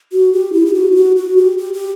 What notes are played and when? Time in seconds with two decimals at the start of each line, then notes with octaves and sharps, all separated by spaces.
0.12 F#4
0.33 G4
0.53 E4
0.66 G4
0.74 F#4
0.92 E4
0.95 F#4
1.16 F#4
1.37 G4
1.58 G4
1.74 G4